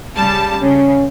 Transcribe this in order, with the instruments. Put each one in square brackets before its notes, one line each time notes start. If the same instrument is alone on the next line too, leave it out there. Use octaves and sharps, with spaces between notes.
[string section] C#3 G3 A5
[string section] C#3 [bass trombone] C#4